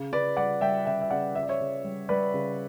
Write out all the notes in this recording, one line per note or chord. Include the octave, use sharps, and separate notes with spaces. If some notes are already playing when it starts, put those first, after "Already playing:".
Already playing: C#3
C#3 B4 D5
G3 D5 F#5
G3 E5 G5
C#3 E5 G5
E5
C#3 D5 F#5
C#3 E5
D5
C#5 E5
C#3
G3
G3 B4 D5
C#3